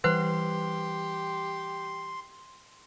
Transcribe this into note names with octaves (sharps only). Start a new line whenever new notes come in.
E3 G3 G4 B4 C5 F#5 C6